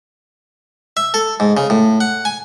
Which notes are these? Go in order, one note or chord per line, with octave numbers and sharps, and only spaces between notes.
E5
A4
G#2
C#3
A2
F#5
G#5